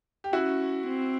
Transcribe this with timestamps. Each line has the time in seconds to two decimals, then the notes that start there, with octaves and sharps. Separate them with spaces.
0.24 G4
0.32 C#4 E4 F#4
0.87 C4